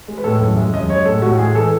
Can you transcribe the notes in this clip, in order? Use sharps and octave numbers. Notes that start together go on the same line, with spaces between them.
G#3
B4
A2 A4
F#2
G#3 E5
F#2 D#5
G#3 C#5
A2 A4
A2 F#4
G#3 G#4
E3 A4